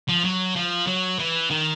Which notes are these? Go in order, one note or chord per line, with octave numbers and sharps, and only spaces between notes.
F3
F#3
F3
F#3
E3
D#3